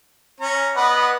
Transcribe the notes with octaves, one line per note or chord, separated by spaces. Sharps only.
C#4 C#5 A#5
B3 B4 D5 D#5 F#5